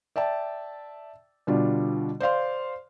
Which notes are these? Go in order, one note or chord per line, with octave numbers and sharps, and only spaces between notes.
D5 E5 G5 A5
B2 D3 G3 D4 F4
C5 D5 F5 C6